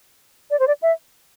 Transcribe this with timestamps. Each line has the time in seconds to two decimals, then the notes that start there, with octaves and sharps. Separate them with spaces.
0.51 D5
0.59 C5
0.67 D5
0.82 E5